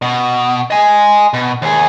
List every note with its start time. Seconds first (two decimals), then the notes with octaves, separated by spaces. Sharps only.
0.02 B2
0.71 D#5 G#5
1.34 B2
1.62 D#2 G#4